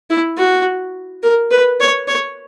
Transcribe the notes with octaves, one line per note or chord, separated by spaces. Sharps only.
E4
F#4
A#4
B4
C#5
C#5